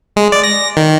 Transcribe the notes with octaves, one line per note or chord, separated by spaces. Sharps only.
G#3
D5
A#6
D#3